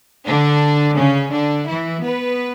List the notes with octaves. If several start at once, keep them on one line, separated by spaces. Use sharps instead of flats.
D3 D4
C#3 C#4
D3 D4
E3 E4
B3 B4